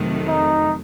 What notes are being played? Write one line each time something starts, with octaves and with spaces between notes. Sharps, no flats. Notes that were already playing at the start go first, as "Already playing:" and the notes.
Already playing: F2 C3 D#3 F#3 A3
D#4